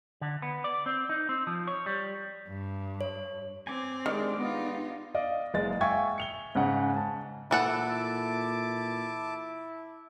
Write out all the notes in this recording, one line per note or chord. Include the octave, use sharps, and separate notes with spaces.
D3
B3
D5
C4
D#4
C4
F3
C#5
G3
G2
C#5
C4 G#5 D6
D#3 G#3 D4 G4 D5
B3 D#4 F4
D5 D#5 F5
F#1 G#3 G#4 A6
E5 F5 G5 G#5 C#6 G#6
C#7 F7 G7
G#2 C#3 F#5
A5
A#2 E3 E4 A4 F#5 A5 D6